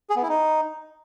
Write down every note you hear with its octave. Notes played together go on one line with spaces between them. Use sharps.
G#4
B3
E4
D#4